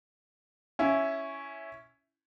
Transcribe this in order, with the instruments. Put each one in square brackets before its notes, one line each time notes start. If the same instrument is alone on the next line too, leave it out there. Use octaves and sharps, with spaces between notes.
[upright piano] C#4 E4